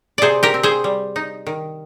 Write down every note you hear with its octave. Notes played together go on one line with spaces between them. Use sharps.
C3 G#4 C5 D5
G4 A#4
C4
G#4 C5
G3
D#4
D#3